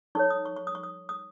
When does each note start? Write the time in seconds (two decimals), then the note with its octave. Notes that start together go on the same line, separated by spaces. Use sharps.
0.15 D#4 A4 C#5 C#6
0.30 D#6
0.46 C#6
0.56 C#6
0.67 D#6
0.75 C#6
0.83 D#6
1.09 D#6